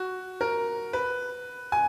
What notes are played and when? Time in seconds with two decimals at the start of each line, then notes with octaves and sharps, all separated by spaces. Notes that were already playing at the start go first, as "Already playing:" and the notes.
Already playing: F#4
0.41 A#4
0.93 B4
1.72 G#5